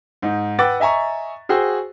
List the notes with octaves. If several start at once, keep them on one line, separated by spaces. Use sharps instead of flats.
G#2 D#4
B4 F#5 G5 D6 E6 A6
D#5 E5 G#5 A#5 C#6
F#4 G#4 C5 G5 E6